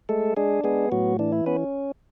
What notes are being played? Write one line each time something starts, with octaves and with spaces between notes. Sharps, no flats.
G#3 A3 A4
G#3 D4 G#4
G#3 B3 G#4
A2 F#3 F#4
E3 D4
E4
B3 C#4 B4